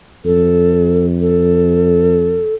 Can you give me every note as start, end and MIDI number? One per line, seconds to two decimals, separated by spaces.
0.25 2.45 41
0.25 1.06 69
1.21 2.55 69